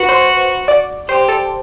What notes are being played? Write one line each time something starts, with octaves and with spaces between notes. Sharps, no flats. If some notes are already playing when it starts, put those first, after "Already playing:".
Already playing: F#4 B4
C5
D5
G4 C5
A4